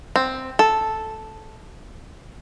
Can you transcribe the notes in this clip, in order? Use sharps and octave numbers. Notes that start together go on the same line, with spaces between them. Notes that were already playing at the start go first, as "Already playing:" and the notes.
C4
A4